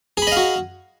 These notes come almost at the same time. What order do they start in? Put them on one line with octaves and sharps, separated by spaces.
G#4 B5 D#5 F5 F#4